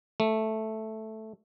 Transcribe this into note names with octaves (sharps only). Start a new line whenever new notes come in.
A3